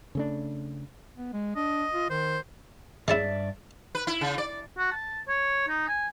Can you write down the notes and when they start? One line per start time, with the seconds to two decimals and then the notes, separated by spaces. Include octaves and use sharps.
0.15 C#3 A3 D4
1.17 B3
1.33 G#3
1.56 D4 D#5
1.93 F4
2.10 D#3 C5
3.08 G2 G#3 C#4 E4 D5 E5
3.95 B4
4.07 E4
4.21 C#3
4.38 D5
4.78 F#4
4.92 A5
5.28 C#5
5.68 D#4
5.88 G#5